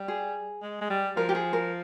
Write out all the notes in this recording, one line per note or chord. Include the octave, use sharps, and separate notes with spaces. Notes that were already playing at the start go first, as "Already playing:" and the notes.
Already playing: G3
G#4
G#3
G#3
G3
F3 A#4
G4
G#4
A#4